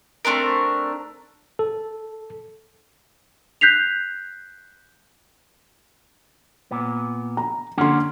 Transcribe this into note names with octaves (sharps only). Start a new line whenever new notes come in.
A3 C4 D4 A#4
A4
F#6 G6 B6 C7 F7
A#2 B3
A#5
D3 A#3 C#4 F#5 C6